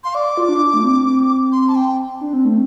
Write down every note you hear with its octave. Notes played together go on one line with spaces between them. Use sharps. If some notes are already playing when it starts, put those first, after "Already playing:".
F5 C6
D5 D6
F4
D4
A3
C4
C6
A5
G5
D4
C4
A3